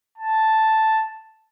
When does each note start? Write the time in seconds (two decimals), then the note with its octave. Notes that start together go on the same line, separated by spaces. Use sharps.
0.18 A5